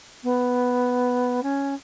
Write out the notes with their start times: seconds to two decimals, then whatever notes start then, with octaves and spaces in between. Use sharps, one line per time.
0.23 B3
1.42 C#4